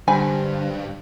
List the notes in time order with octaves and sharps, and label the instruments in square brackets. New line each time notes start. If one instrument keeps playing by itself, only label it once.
[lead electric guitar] G2 [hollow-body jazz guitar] D3 G3 B5 [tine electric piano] D4 C5 [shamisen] G#5